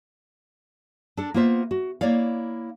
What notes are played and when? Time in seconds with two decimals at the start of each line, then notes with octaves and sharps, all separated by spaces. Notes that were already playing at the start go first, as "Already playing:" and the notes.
1.17 D4 A4
1.34 A#3 B3 E4 F4 C5 E5
1.71 F#4
2.01 A#3 E4 C#5 D5 F5